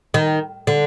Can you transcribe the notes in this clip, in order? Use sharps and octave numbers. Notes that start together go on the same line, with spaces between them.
D#3
D3